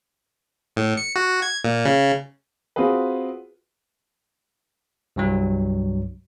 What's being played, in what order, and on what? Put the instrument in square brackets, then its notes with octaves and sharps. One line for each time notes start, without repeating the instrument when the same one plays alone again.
[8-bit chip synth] A2
C#7
F#4
G#6
A#2
C#3
[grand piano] C4 F4 F#4 G#4 B4
[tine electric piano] C2 G2 F#3